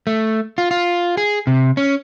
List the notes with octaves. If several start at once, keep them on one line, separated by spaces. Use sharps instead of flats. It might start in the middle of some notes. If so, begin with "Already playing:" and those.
A3
F4
F4
G#4
C3
C#4